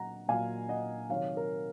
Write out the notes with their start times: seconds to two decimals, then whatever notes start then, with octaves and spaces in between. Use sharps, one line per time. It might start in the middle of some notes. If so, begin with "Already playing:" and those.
Already playing: A#2 F#3 F#5 A#5
0.28 A#2 F#3 F5 G#5
0.69 D#5 F#5
1.09 C3 D#3 F#3 C#5 F5
1.37 A#4